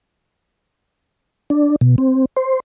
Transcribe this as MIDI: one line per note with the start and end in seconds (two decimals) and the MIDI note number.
1.50 1.76 62
1.81 1.96 47
1.98 2.25 60
2.37 2.60 72